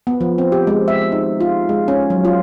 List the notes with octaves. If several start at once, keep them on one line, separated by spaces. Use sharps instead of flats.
B3
F3
C4
G4
G#3
E5
D#4
F4
G#3
C#4
F#3
F4